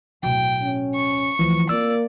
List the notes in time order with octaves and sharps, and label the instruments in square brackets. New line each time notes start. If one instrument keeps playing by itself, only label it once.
[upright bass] D1 B2 [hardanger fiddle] G5
[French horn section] C#4
[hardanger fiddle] C#6
[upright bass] D2 [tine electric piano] E3 F3
[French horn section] A#3 [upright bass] C4 F4 [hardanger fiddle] D5 [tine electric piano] E6